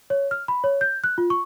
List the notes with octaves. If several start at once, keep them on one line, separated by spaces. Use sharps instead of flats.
C#5
F6
B5
C#5
G6
F#6
F4
C#6